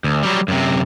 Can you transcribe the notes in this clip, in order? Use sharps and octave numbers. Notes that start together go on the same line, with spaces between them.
D2
F#3 G3
F#2 C3